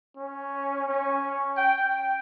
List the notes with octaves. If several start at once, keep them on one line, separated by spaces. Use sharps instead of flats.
C#4
C#4
G5